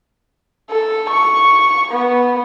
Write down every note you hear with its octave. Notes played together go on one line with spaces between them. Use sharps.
A4
C#6
B3